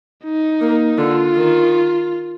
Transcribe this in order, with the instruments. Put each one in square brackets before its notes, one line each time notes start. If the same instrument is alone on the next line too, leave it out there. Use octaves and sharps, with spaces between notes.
[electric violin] D#4
[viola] A#3
[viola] D3 [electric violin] F4
[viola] D#3